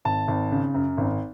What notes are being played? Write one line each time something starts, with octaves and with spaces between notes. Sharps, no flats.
G#1 A5
G#1
C#3
F#2
G#1